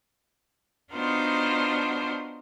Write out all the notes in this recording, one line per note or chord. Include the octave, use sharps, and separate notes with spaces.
B3 D4 D#4 F4 F#4 C5